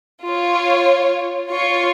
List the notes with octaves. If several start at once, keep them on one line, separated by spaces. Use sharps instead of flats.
F4 C#5
F4 C#5 C#6